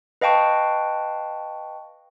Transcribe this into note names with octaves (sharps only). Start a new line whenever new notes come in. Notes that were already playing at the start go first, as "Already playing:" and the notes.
B4 D#5 F5 G5 A5 C#6